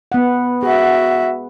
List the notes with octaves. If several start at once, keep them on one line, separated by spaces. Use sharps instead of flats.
B3 F#5
F#4 G#4 E5